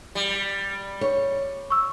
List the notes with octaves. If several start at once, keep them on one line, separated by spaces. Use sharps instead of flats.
G3
C#5
C#6 E6